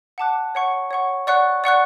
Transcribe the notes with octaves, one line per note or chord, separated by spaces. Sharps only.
F#5 A5 D6 F#6
C#5 F#5 C#6
C#5 F#5 C#6
D5 F#5 C#6 F#6
D5 F#5 C#6 F#6